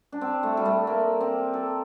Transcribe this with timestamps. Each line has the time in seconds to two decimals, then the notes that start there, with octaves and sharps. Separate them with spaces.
0.12 D4
0.21 C4
0.43 A3
0.57 G3
0.65 A3
0.87 A#3
1.21 C4
1.53 A4